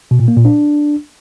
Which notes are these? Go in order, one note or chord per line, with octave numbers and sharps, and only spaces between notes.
B2
A#2
A#3
A#2
D4